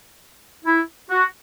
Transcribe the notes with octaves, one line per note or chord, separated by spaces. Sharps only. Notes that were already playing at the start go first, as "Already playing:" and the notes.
E4
F#4